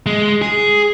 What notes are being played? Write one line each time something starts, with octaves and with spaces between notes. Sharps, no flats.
G#3
G#4